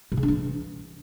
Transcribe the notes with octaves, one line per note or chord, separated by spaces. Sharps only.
B2
C#3
D4
E3